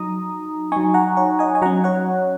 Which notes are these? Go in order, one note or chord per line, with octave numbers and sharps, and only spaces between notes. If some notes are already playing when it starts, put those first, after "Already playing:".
Already playing: F#3 D#4 A#5 D#6
F#3 D#4 G#5 C#6
F#5 A#5
C#5 F#5
D#5 G#5
G#5
F#3 C#4 F#5 A#5
C#5 F#5